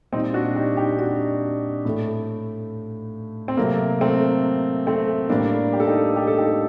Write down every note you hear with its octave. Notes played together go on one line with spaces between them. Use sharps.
A#2 G3 C4 D#4
D4 F#4
D#4 G4
D#4 G4
D4 F#4
A2 A3
C4
C3 F#3 A3 A#3
A3 C4
A3 C4
A2 G3 A#3 D4
G4
A4
D#4 G4
G4
A4
D#4 G4